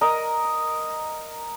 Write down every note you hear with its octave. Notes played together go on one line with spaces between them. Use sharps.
A#4 D#5